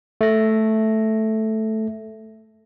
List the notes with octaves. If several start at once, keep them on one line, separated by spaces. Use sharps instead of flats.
A3 A#6